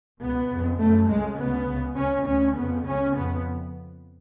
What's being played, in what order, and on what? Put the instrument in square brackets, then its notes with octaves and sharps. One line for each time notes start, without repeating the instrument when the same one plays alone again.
[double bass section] C#2 B2 B3
F2 C#3
F#2 C#3 A3
C#2 C#3 G#3
D2 C#3 B3
C#2 C#3
C#2 C#3 C#4
D2 C#3 C#4
F2 C#3 B3
C#2 C#3 C#4
F2 C#3 B3